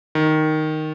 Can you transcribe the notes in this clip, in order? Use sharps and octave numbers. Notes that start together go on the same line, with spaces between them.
D#3